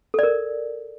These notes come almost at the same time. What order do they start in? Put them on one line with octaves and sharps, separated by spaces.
A4 D5 A#4